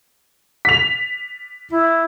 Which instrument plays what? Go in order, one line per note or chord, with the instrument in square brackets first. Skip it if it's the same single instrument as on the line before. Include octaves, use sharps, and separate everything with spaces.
[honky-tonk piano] B6 F7
[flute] E4